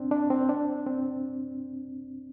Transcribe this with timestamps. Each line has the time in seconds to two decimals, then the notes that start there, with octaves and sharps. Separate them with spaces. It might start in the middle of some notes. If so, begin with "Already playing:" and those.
Already playing: C4 D4 C5
0.11 D4
0.30 C4
0.49 D4
0.86 C4